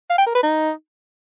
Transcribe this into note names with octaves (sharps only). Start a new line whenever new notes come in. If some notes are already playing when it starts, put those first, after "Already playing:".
F5
G5
A#4
B4
D#4